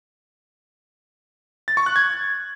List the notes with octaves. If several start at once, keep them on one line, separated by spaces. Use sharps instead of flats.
A6
C#6
F#6
G#6